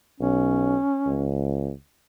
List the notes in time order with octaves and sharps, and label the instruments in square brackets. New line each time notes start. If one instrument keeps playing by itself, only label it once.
[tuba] B1 [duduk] C#4
[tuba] C#2